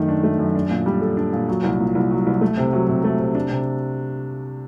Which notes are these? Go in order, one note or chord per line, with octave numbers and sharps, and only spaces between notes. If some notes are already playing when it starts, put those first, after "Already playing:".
Already playing: F#2 D#3 A3
D4
A3
F#2
D4
A#2
G3
A4
D4
A#2
F#3
C2
A#2
C2
F#3
C2
A3
C3
F#3
C3
A3
C3
D4
C3